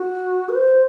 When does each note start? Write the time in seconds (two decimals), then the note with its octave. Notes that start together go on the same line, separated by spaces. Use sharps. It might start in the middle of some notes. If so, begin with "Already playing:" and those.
Already playing: F#4
0.49 B4
0.55 C5